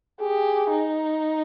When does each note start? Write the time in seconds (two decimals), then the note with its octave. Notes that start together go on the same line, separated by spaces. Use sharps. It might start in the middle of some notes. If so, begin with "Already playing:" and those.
0.21 G4 G#4
0.70 D#4